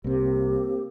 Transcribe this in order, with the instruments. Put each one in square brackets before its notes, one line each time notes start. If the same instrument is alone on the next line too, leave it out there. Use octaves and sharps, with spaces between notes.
[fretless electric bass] C2 C3 [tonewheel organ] A#3 C4 [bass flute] G4